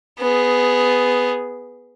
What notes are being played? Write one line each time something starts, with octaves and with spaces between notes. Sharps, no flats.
B3 G#4